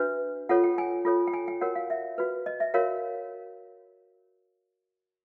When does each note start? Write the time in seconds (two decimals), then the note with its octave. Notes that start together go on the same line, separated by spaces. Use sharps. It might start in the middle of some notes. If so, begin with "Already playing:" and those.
Already playing: D4 F#4 B4 E5
0.49 F4 A4 C#5 F#5
0.64 G5
0.78 G#5
1.05 F4 A4 C#5
1.27 G5
1.33 G#5
1.48 G5
1.61 F#4 A#4 C#5 F#5
1.75 F5
1.90 E5
2.18 F#4 B4
2.46 D#5
2.60 E5
2.74 F#4 A#4 C#5 F5